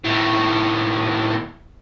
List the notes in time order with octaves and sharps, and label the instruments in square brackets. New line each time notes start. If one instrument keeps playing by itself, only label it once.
[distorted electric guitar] D#2 A2